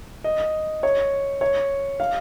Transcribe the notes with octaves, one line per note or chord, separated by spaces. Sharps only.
D#5
C#5
C#5
F5